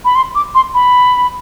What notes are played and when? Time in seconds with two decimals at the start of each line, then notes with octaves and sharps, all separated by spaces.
0.05 B5
0.15 C6
0.35 D6
0.55 C6
0.74 B5